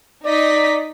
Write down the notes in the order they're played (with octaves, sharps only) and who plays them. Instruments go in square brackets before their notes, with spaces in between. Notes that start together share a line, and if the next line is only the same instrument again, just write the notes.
[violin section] D#4 D#5 B6 [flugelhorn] D5